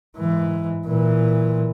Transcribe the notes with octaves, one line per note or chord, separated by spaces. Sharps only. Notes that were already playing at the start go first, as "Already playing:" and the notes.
G#2 E3
A#2 E3